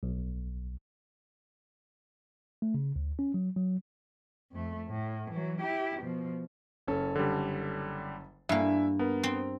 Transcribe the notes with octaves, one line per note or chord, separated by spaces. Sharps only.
B1
A3
C#3
D2
C#4
F#3
F#3
F2 A3
A2
E3 F#3
E4 G4
B2 F3
F#1 C#4 A4
D3 G3
G2 A#3 D4 E4 E5 G#5
B3 A#4
C4